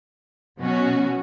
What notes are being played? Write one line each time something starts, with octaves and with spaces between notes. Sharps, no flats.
B2 F#3 C#4 F#4